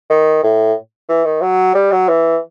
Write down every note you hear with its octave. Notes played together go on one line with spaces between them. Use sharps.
D#3
A2
E3
D#3
F#3
G3
F#3
E3